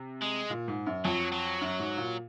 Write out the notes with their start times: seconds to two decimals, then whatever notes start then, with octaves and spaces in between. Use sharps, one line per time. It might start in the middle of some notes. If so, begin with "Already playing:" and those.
Already playing: C3
0.21 G#3
0.50 A#2
0.68 G#2
0.86 F#2
1.05 F2 F#3
1.32 F#3
1.61 F#2
1.79 G#2
1.97 A#2